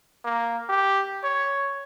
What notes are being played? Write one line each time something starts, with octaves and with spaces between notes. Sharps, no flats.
A#3
G4
C#5